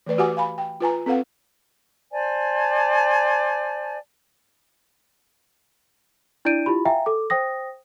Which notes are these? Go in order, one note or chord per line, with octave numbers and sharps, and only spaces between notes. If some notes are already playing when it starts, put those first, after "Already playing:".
E3 A3 B4 D5
F#4 G4 B4 F#5 G#5 D6
F5 G#5 B5
G5
F4 B4 G#5 A#5
C4 A4 B4 F5 F#5
C5 D5 G#5 A5
D4 E4 D5 G6 D7 D#7
E4 F4 G4 B5
E5 F5 G5 G#5 A#5
A4 D6
C5 G5 D#6 A#6